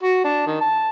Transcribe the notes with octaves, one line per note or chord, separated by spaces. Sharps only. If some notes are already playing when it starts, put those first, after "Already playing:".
F#4
D4
D#3
A5